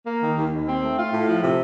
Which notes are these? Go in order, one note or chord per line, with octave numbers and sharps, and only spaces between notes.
A#3
D#3
D#2
D#2
C4
A3
F4
A2
F3
C3